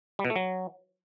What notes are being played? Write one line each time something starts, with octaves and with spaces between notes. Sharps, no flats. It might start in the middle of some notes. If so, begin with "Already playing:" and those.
G3
B2
A3
F#3